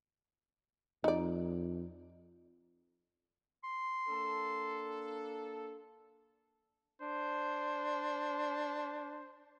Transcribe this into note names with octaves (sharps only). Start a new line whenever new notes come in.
F2 D#4 D5
C6
A#3 D4 A4
D4 C5